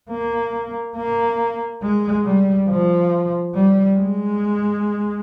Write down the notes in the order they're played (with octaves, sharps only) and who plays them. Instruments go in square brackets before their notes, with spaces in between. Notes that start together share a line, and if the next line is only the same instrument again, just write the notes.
[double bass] A#3
A#3
G#3
G3
F3
G3
G#3